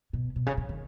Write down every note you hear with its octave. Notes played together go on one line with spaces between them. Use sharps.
B2
B2
C#3
C#3
D#3